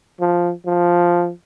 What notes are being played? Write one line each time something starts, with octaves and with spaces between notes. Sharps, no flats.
F3
F3